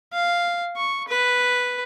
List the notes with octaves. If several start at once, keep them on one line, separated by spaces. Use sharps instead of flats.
F5
C#6
B4